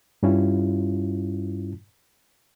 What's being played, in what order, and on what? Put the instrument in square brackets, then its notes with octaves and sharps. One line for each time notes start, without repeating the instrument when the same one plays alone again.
[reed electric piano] G2 G3 C#4 E4 F4